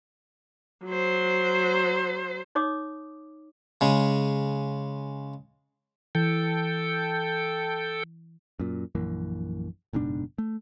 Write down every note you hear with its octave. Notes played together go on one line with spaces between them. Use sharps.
F#3 C5
D#4 C#5 D6 D#6
C#3 G#3
E3 A4 G5
F#2 A#2
A#1 F#2 E3 A#3
F#1 G#2 B2 D4
A3